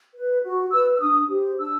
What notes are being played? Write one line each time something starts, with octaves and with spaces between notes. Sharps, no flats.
B4
F#4
B4 E6
E6
D4 D#6
G4 C5
D4 E6